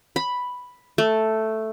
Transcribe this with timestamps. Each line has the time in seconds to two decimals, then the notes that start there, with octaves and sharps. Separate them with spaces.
0.16 B5
0.98 A3